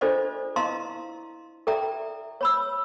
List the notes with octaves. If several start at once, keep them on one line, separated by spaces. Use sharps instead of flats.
D4 F4 A4 C5 D5 D#5
E4 D#5 F5 A5 A#5 C6
A4 D5 E5 G5 A#5
C#5 B5 E6